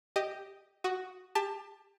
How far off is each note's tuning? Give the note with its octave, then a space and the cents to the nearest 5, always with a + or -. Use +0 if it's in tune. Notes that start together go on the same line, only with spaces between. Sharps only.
G4 +0 D#5 +0 D#6 +0
F#4 +5 D#6 +0
G4 +30 A5 +0